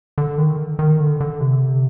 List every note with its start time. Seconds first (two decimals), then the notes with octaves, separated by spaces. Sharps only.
0.18 D3
0.38 D#3
0.79 D#3
1.00 D3
1.20 D3
1.41 C3